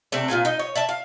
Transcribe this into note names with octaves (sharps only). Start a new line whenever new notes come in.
C3 A3 C4 D4
A#2 F4 G#5
D#4 D#5
C#5
D5 E5 A5
F5